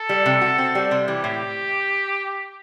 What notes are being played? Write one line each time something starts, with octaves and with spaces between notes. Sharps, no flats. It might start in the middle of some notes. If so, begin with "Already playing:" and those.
Already playing: A4
G3
C3
F#4
C4
G3
C3
E3 G4
A2